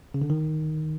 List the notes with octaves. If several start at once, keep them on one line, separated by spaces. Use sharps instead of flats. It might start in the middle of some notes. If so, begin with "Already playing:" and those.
C#3
D3
D#3